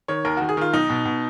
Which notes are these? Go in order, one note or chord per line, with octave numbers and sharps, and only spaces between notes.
D#3 C#5
D#2 A#4
D#3 F#4
G#4
D#3 F4
B1 D#4
B2
B2